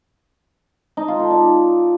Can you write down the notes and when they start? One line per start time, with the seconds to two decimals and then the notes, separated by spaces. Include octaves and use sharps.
0.97 D#4
1.08 F4
1.19 A4
1.30 D5